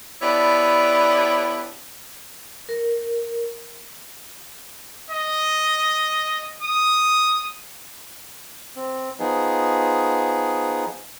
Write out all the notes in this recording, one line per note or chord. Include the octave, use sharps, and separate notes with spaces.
B3 D4 E4 G4 C#5 D5
A#4
D#5
D#6
C4
F3 B3 D#4 G#4